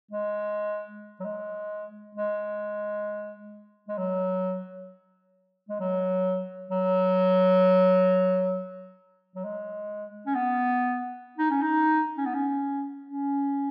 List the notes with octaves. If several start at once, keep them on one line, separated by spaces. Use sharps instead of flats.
G#3
F#3
G#3
G#3
G#3
F#3
G#3
F#3
F#3
F#3
G#3
C#4
B3
D#4
C#4
D#4
C#4
B3
C#4
C#4